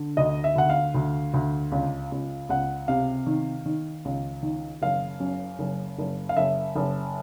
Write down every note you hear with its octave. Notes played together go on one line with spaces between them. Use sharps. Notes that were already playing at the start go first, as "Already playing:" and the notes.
Already playing: D3
D2 D#5
E5
D2 F#5
F5
D2
D2
C#2
C#2
C#2 F#5
C3 F5
D#3
D#3
C#2
D#3
F#1 F5
F#2
F#1
F#1
F5
F#1 E5
F#1